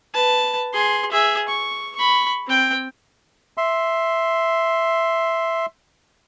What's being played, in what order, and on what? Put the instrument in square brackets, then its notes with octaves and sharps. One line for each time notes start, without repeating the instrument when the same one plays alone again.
[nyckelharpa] B4 A5
G#4 C6
G#4 E5
C#6
B5 C#6
C4 G5
[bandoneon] E5 C6